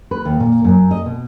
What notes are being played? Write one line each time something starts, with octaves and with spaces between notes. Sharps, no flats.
B4
D#2
A#2
F#2
D#5
B2